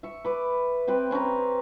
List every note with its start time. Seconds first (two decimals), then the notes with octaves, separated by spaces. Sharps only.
0.03 E5 C#6
0.25 B4 D6
0.88 C4 G4 B4
1.11 C4 C#4 B4 A#5